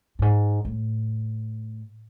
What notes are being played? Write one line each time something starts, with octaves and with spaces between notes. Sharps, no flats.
G2
G#2
A2